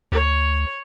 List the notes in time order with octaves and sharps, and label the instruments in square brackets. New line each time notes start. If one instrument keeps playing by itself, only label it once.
[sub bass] D2 [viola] C#5